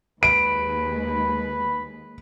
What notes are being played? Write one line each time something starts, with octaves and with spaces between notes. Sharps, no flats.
D#2 G#3 B4 B5 D7